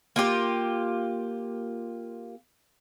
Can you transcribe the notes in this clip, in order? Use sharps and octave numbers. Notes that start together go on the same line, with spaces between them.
A#3 F4 G4